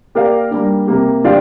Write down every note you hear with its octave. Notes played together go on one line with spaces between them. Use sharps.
A#3 G4 A#4 D5 F5
G3 A#3 D4
C3 A#3 G4
F3 D4 G4 D5 F5